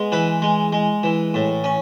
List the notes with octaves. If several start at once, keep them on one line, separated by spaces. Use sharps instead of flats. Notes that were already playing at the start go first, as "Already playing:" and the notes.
Already playing: G#3 B3
E3 B4
G#3
G#3
E3
A2
C#4